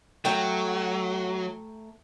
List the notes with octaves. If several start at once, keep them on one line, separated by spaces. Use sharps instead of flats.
F#3 A3 G5 A#5